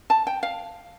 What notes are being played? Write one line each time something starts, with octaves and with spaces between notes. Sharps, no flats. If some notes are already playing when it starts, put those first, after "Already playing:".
A5
G5
F5